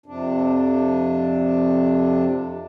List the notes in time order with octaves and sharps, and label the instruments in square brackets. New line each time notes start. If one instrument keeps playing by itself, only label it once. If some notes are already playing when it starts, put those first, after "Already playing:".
[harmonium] F2 C3 D4